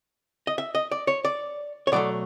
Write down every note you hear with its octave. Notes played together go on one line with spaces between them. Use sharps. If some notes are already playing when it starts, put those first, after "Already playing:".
D#5
E5
D#5
D5
C#5
D5
C#5
B2 F#3 A3 D5